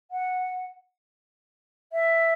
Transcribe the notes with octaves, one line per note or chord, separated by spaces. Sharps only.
F#5
E5